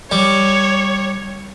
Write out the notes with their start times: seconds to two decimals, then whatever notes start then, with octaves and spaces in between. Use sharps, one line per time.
0.12 G3 C#5